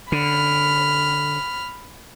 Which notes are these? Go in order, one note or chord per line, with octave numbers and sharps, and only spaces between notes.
D3 B5 F6